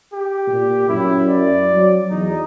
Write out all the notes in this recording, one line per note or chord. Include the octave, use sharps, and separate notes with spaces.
G4
A#2
F#2 E4
D5
F#3
E2 D#4